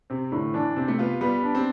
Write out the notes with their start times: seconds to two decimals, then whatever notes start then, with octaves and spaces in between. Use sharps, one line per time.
0.10 C3 C4
0.32 A2 D3
0.54 E3 D4
0.76 C3 C4
0.88 A3
0.98 B3 F4
1.21 G3 B3
1.43 D4
1.55 C4